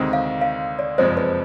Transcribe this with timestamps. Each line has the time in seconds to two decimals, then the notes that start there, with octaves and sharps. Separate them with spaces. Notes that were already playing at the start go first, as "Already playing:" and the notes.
Already playing: D2 C3 D#3 G#3 C4
0.13 F5
0.41 F5
0.79 D5
0.98 F#1 F2 C3 F3 G#3 C5
1.17 B4